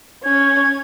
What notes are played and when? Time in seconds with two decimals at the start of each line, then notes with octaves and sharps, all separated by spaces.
0.24 C#4 G#6